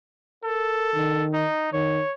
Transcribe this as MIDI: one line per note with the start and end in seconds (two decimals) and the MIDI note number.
0.44 1.25 69
0.44 0.93 70
0.94 1.46 51
1.33 1.69 63
1.73 2.01 51
1.73 2.13 73